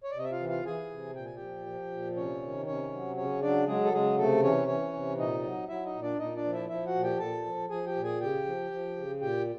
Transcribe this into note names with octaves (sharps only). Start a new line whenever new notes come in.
C#5
D5
C3 D#5
E5
F4 F5
E3
F4 F5
E3 G#4 G#5
C3
A#2 G5
G#5
G4 G5
F3
F3
A#2
C3 C#4 C#5
D#3
C3 C#4 C#5
F#3
C#3 C#4 C#5
F#3 D4 D5
F#3 G#3 G#4
A4
C#3 G#3 G#4
C3 A3 A4
E3 C#4 C#5
E3 C#4 C#5
C3
A#2 D#4 D#5
F#3
F#3 E4 E5
D#4 D#5
A#2
D4 D5
A#2 D#4 D#5
D4 D5
F3
E4 E5
F3 E4 E5
F#4 F#5
A#2
G4 G5
A#2 A4 A5
F3
F3 G#4 G#5
G4 G5
A#2
G#4 G#5
C#3 G4 G5
F3
F3
C#3
A#2 G4 G5